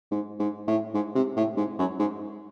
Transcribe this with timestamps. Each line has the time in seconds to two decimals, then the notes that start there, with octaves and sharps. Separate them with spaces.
0.11 G#2
0.39 G#2
0.67 A2
0.94 G#2
1.15 C3
1.36 A2
1.57 G#2
1.78 F#2
1.99 G#2